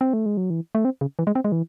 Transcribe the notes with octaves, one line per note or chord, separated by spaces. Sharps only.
C4
A3
G#3
F#3
E3
A3
C4
C#3
E3
G#3
C4
G#3
E3